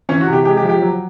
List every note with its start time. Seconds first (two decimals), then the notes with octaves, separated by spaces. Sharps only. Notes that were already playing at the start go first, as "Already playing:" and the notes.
0.09 E3 C#4
0.21 F#4
0.27 C3
0.33 G4
0.45 G#3 G4
0.57 G4
0.63 F3
0.69 G4
0.82 F#3